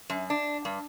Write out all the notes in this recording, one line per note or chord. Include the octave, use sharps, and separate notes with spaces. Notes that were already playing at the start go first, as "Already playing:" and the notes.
F#2
D4
G2